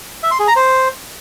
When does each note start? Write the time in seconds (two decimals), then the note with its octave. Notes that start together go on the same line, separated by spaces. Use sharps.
0.23 E5
0.31 C6
0.40 G#4
0.48 A#5
0.56 C5